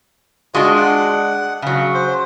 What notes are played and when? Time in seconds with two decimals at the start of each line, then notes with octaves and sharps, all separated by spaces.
0.54 G#3 D4 F4 F#4 D#5
0.77 F#5
1.62 C#3 F#3
1.94 C5